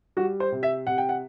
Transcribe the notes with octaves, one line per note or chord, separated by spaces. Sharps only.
G3 F#4
C5
C3
E5
C3 F#5
G5
F#5